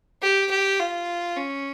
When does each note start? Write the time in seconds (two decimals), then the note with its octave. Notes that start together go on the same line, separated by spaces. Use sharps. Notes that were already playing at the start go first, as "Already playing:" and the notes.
0.22 G4
0.50 G4
0.80 F4
1.36 C#4